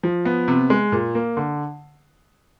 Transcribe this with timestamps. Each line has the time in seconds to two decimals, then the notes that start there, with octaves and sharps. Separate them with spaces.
0.03 F3
0.25 B3
0.48 C3
0.70 G#3
0.92 A#2
1.15 A#3
1.37 D3